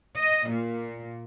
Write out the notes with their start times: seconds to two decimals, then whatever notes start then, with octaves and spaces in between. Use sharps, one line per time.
0.15 D#5
0.49 A#2